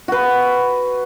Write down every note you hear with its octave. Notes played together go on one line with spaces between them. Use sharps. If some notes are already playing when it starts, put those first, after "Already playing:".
F#4 B4